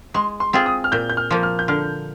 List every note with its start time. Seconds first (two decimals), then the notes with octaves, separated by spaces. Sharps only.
0.14 G#3 C6
0.40 C6
0.53 C4 F4 G#4
0.66 D#6
0.84 F6
0.92 A#2 G6
1.10 G6
1.17 F6
1.31 F3 A#3
1.43 F6
1.59 G6
1.68 D3 F6